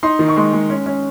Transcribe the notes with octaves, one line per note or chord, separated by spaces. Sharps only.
D#4 C6
D#3
C#6
G#3 C6
G#3
C#4
C#4